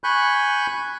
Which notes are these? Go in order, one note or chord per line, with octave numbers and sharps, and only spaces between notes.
G#5 B5 C#6 F#6 G6